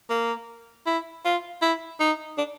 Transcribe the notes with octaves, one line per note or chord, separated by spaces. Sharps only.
A#3
E4
F4
E4
D#4
D4